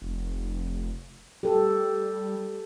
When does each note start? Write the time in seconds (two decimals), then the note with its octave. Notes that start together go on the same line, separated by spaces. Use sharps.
0.02 F1
1.43 G3 G4 A4